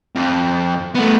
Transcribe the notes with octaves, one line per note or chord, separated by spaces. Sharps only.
F2
A3 B3